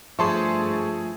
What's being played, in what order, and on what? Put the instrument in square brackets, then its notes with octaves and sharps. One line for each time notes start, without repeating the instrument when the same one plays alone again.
[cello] G2 A3 [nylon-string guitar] F3 [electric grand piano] G#4 A5 C#6 [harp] E5 C6